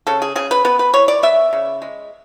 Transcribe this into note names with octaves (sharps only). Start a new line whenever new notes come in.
C#3 A4
G#4
C#3 G#4
B4
B3 B4
B4
E3 C#5
D5
B3 E5
C#3
G#3